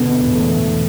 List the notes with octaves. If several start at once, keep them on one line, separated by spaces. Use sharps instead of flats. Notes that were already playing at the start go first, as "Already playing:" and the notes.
Already playing: B2 D3 B3
E1
A3
E1